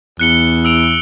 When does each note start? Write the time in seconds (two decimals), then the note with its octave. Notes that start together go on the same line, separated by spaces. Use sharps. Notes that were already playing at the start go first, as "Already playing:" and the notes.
0.20 E2 F#6 C#7 G7
0.65 E6 D7 F7